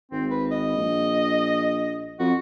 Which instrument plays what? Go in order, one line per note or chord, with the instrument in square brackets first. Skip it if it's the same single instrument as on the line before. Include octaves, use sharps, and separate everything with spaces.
[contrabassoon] G#1 [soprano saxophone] C4
[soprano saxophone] B4
D#5
[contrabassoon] A#1
[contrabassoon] F2 [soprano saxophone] F#4